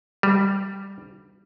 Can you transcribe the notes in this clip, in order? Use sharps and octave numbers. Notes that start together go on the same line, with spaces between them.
G3